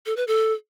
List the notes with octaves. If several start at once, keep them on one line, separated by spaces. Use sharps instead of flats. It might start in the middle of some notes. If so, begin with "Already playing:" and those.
A4
B4
A4